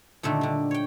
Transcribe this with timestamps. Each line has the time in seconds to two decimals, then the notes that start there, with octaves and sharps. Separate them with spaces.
0.23 A#2 D3 D#3 A3
0.41 D3 G3
0.71 C#5 G5